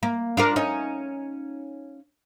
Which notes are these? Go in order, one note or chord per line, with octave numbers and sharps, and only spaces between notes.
A#3
D4 F4 A#4
C#4 D#4